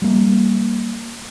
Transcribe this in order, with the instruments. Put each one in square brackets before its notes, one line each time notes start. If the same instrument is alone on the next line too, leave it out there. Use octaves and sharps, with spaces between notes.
[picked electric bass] G3 A#3